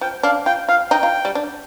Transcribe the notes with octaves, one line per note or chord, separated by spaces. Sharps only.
F3 G5
D4 F5
F4 G5
F4 F5
D#4 G5
F4
G3
D4